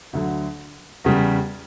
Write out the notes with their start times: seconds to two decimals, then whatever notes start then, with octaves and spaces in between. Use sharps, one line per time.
0.13 D2 D3 F#3
1.04 E2 C#3 G3